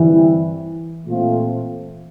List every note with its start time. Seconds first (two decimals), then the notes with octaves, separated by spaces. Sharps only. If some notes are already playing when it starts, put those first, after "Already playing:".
Already playing: G2 D3 E3 G3 C4 E4
1.07 A#2 A3 C4 F4